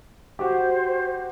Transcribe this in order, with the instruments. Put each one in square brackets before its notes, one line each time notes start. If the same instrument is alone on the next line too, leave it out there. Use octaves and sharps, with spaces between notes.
[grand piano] F#4 G4 [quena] C5